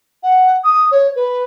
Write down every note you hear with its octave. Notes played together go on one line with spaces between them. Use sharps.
F#5
D#6
C#5
B4